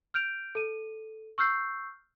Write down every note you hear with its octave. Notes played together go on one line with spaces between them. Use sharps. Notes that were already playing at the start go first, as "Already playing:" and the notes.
F6 G6 D7 F7
A4 D#7
C#6 E6 F6 G6 C7